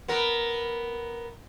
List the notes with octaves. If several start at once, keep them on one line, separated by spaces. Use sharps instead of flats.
B3 A#4